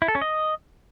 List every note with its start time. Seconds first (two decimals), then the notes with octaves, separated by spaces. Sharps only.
0.02 E4
0.08 A4
0.15 C#4
0.22 D#5